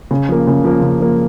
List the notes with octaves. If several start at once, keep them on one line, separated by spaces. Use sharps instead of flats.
C#3
F3 A#3
C#3
F3 A#3
C#3
F3 A#3